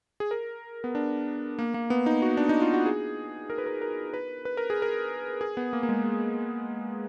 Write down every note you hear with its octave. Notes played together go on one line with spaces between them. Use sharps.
G#4
A#4
B3
D4
A#3
A#3
B3
D#4
F#4
D4
D#4
F4
F#4
G#4
A#4
B4
A#4
A#4
B4
B4
A#4
G#4
A#4
G#4
B3
A#3
A#3
G#3